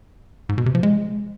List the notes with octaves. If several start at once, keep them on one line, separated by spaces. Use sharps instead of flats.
G#2
B2
C3
F3
G#3